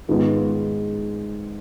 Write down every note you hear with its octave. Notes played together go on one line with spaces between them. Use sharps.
G#2 D#3 G#3 B3 F4